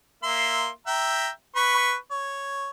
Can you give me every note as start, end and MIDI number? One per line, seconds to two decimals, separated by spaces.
0.23 0.68 58
0.23 0.68 76
0.23 0.68 84
0.87 1.29 76
0.87 1.29 79
0.87 1.29 82
1.56 1.94 71
1.56 1.94 83
1.56 1.94 85
2.11 2.71 73